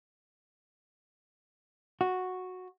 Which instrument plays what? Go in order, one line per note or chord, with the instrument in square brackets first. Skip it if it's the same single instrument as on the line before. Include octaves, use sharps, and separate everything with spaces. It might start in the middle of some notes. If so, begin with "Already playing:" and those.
[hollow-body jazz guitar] F#4